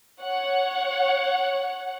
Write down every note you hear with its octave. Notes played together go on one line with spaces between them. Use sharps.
C#5 F#5